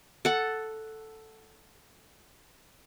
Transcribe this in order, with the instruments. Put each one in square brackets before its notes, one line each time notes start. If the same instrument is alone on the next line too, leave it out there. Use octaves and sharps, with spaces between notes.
[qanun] A4 F#5